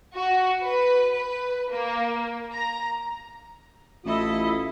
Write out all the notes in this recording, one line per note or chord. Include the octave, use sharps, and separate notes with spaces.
F#4
B4
B4
A#3
A#5
A1 E4 F4 A4 D#5